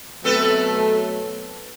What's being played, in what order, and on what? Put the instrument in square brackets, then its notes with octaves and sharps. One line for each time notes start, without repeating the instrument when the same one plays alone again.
[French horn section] B2 F#3 A3 [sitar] C4 A4 B4